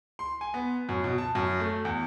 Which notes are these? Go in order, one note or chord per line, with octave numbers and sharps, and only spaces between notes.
C6
G#5
B3
F#2
B2
A5
F#2
A3
E2